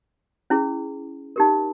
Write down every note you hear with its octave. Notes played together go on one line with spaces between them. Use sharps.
C#4 E4 G#4
D#4 G4 A#4